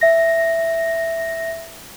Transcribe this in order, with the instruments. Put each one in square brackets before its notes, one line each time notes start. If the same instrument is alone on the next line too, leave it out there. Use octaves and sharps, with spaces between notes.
[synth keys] E5 A#6